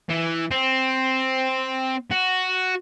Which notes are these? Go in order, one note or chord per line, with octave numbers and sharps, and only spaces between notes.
E3
C4
F#4